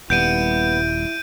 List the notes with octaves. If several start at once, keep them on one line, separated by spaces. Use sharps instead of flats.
D#1 G3 B3 E4 G6 D7 D#7